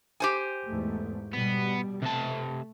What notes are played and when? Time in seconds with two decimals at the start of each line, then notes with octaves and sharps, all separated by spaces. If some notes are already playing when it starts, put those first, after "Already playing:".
0.20 G4 C5 G#5
0.67 E2 G#2 A3
1.33 B2 G3 B3
2.03 C3 A3 A5